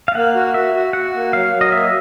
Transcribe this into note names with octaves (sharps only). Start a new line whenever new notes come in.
F5
A#3 F#5
F#4
F#4 E5
F#4
F#4 F#5
A#3
F#3 F5
F#3
D#5
A#3 E5